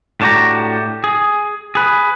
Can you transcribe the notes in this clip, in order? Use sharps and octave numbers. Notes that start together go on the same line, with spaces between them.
A2 D4 F#4 G4 A#5
G#4
G#4 B4